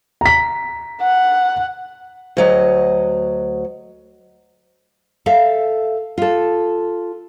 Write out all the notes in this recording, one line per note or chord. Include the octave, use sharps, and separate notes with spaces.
A#5 B6
F#5
D2 F#3 D#5
A4 E5 F5
F4 A4